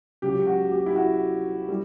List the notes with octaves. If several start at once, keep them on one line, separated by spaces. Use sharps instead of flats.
C#2 C#3 F#3 G4
F#4
G4
E4
F#4
G3